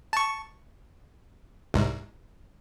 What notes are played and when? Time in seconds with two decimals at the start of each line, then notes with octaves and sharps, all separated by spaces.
0.13 A5 C#6
1.74 C2 G#2